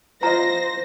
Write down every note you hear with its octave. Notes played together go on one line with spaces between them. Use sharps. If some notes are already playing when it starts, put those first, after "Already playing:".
F4 C5 D#5 A#5 A#6